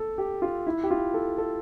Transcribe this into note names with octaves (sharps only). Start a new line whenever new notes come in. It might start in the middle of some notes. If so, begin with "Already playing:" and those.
Already playing: A4
G4
F4
E4
G4
F4
A4
A4